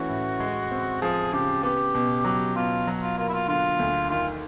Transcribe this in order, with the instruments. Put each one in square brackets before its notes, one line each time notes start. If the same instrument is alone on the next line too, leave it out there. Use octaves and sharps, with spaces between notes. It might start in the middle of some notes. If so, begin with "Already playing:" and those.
Already playing: [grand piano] E3 A3 C#4 [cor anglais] F#4
[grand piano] A2
G#3
C4
[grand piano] F3 [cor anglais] G#4
[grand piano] C#3 [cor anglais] G4
[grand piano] B3 [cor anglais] G4
[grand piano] B2
[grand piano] F#3 [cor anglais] G4
[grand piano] B2 [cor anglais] F4
[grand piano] F#3
[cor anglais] F4
[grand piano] A#3 [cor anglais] F4
[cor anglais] E4
F4
[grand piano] D3 [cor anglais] F4
[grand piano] D2
[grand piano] D#3 [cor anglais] F4